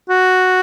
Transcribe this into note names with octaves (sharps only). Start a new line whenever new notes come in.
F#4